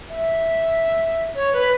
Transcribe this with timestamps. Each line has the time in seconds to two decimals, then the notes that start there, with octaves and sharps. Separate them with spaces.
0.10 E5
1.35 C#5
1.53 B4